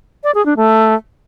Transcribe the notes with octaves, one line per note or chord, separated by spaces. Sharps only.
D5
G#4
D4
A3